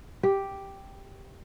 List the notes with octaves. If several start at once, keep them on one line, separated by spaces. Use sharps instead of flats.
G4